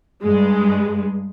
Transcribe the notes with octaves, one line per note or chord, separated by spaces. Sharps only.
G2 G#3